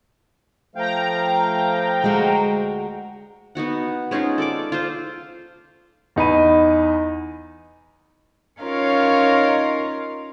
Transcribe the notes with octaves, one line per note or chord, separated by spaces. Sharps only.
F3 A3 F5 G5 A#5
D2 G#3 F#4
B3 D#4 F#4 F#5
G#3 C#4 D#4 F4
A4 D5 D6
F4 C5
E2 D#4 B5 D#7
C#4 D#4 F4 A#4 C#5 F5